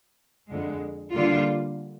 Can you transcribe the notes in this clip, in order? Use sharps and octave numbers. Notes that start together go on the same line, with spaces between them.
F2 D3 G#3
D3 G3 A#3 F4